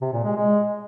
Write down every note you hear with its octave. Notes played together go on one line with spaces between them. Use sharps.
C3
A#2
G#3
G#3